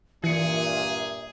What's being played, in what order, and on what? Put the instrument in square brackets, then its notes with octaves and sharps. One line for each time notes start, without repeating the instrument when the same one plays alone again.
[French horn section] G2 A#2 [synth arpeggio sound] E3 C#7 [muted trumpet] G#4 [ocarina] E5